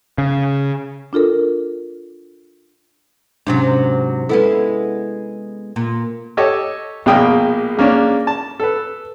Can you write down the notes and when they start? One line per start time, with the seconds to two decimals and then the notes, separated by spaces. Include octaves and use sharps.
0.18 C#3
1.13 D4 F4 A4 A#4
3.47 G#2 C3 F#3 C#4 D4
4.29 G#3 B3 E4 A4 B4
5.76 A#2
6.37 G4 A4 C#5 D#5 D6
7.06 A#1 B2 G#3 A#3 G5 D#6
7.77 G#3 A#3 C#4 D4
8.27 A5
8.60 A4 B4